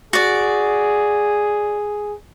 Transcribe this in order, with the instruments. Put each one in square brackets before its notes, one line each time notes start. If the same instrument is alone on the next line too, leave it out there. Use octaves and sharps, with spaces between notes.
[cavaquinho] F#4 D5 [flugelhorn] G#4